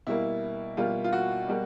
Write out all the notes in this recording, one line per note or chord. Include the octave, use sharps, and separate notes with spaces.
B2 G3 A#3 E4
B2 G3 A#3 F4
F4
F#4
B2 G3 A#3